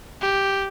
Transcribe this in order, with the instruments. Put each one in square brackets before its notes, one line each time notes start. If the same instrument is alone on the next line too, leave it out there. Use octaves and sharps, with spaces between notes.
[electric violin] G4